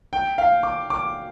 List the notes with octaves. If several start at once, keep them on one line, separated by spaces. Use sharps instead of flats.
G5
F5
D6
D6